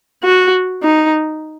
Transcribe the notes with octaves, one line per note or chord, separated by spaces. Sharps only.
F#4
D#4